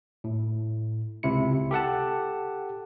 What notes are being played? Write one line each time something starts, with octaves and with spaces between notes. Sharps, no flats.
A2
C#2 C3 E4 C#7
G4 A4 F#5 A5